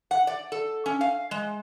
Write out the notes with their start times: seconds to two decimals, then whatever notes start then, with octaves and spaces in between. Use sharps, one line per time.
0.11 F#5
0.27 D5
0.52 A4
0.86 C#4
1.01 F5
1.31 G#3